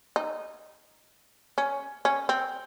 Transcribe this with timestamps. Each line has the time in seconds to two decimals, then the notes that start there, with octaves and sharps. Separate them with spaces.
0.16 D#4
1.58 C#4
2.05 C#4
2.29 C4